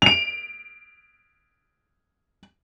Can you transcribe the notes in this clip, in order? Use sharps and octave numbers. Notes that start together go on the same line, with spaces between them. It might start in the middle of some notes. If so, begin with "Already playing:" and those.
D7 F7